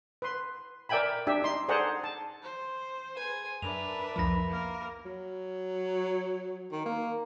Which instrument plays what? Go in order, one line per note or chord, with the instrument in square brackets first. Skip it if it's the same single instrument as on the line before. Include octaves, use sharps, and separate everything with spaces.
[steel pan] B4 C6
A#4 D5 E5 G5 G#5 B5
D4 G4 E5
D#4 C6
G#4 A4 C5 D5 F#5 A#5
A5
[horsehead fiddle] C5
[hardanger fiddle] G#4 G#5 [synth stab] B4
[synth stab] F#2 [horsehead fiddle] D4 B4 [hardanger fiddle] A#4 E5 [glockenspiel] F7
[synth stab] C2 F2 F3 [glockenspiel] B5 A#6
[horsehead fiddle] A#3 A#4
[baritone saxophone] F#3
D#3
A#3